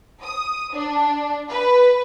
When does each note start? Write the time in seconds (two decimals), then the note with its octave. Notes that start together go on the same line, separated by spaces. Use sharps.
0.23 D#6
0.74 D4
1.49 B4